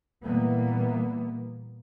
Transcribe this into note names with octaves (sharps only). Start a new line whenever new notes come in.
A#2 E3 G3 A#3 B3